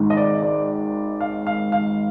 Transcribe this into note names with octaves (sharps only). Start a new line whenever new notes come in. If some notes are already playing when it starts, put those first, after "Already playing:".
Already playing: G#1 G#2 D#3
D#5
D5
D5
F5
F5
F5